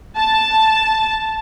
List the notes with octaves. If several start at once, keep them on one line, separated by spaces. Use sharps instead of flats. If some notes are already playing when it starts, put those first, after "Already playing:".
A5